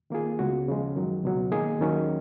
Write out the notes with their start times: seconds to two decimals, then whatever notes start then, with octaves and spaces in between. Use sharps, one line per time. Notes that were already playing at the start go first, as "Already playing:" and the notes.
0.10 D#3 A#3 F4 G#4
0.39 C#2 C#3 G#3 B3 F#4
0.67 D#2 C#3 F3 G#3
0.95 F#2 D#3 F#3
1.23 C#2 B2 F#3
1.51 D#3 A#3 D#4 G#4
1.79 D#2 D#3 F#3 C#4